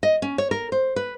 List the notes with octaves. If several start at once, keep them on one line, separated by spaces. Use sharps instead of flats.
D#5
C#4
C#5
A#4
C5
B4